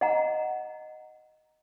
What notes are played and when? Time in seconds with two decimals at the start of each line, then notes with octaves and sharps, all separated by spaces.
0.01 D#5 F#5 A#5